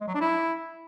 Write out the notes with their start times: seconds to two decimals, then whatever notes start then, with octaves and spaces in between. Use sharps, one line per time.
0.01 G#3
0.08 F#3
0.14 D4
0.21 E4